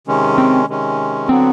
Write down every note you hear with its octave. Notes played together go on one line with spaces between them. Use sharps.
C3 D#3 G#3 C#4
C4
C3 D#3 G#3 C#4
D3 F#3 B3 C4